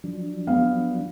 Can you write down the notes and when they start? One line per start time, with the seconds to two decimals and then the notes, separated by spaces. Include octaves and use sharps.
0.04 F3 F#3 D4
0.47 B3 F5